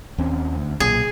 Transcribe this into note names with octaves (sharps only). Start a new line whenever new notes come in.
D#2 C4 C#4
D2
B1 A#2 G#4